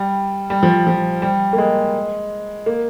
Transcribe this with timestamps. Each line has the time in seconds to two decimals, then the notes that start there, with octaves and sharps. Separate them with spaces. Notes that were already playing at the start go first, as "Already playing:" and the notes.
Already playing: G3
0.50 G3
0.63 F3
0.87 F3
1.22 G3
1.53 A#3
1.58 G#3
2.66 A#3